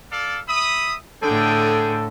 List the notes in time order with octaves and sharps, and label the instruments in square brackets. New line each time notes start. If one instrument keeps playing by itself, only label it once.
[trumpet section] A4 D5 F5
E5 B5 D#6
[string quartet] A2 D3 [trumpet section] G#4 G5 [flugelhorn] A4